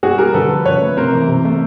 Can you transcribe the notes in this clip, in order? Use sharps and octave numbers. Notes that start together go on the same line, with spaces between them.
G3 F#4 G#4
G3 G#4 A#4
D3 A4 B4
F3
C#3 B4 C#5
A3
C3 A#4 C5
E3
C3
A3